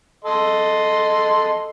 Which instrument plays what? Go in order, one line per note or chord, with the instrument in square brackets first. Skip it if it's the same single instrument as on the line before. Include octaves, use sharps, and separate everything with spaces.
[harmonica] A4 D#5 C6